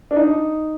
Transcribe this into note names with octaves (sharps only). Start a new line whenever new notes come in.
D4
D#4